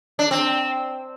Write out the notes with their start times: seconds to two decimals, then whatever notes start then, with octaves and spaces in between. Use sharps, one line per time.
0.19 D4
0.31 C4